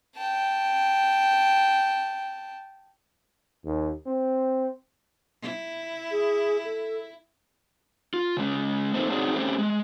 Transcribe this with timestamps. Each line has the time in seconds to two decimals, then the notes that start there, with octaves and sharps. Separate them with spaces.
0.16 G5 A5
3.65 D#2
4.07 C4
5.42 E4
6.11 G#4
6.65 A4
8.14 F4
8.37 C#3 G#3 C#4
8.94 A3 A#3 C4 D#4 A4 C5
9.10 C4 D4 D#4 F#4 G#4 C#5
9.34 A3 C4 C#4 G4
9.59 G#3